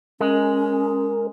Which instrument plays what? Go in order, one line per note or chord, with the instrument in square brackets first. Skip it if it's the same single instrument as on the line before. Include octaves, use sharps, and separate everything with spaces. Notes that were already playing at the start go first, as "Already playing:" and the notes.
[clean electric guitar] G#3 [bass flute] C#4 [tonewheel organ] A#4